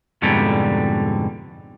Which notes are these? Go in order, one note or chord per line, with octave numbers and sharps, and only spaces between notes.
F2 G#2 B2 D3 G3